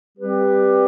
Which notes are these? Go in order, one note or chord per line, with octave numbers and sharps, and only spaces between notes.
G3 C4 G4 B4